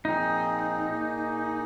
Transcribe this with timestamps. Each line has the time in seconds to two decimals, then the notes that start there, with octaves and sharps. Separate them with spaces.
0.05 A#2 F3 C4 D#4 G#4
0.90 A#2 A#3 G#4